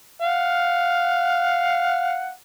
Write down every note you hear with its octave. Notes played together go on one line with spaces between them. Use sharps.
F5 F#5